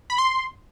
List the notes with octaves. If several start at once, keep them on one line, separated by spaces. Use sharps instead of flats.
B5
C6